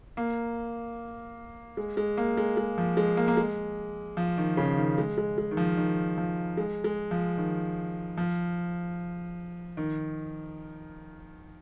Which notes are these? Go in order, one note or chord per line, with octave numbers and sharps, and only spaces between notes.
A#3
G#3
G#3
A#3
G#3
G#3
F3
G#3
A#3
A#3
G#3
F3
D#3
C#3
D#3
G#3
G#3
G#3
D#3
F3
D#3
F3
G#3
G#3
F3
D#3
F3
D#3